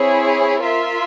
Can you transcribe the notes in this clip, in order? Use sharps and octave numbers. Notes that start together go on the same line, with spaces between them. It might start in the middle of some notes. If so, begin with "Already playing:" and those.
Already playing: C4 E4 G#4 C#5
F4 A#4 E5